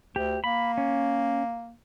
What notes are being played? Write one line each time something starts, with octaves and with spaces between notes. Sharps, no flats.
D2 G4
A#3 B5
C#4